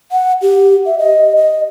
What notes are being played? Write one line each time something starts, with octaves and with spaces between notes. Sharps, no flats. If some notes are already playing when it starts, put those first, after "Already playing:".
F#5
G4
E5
D#5
D#5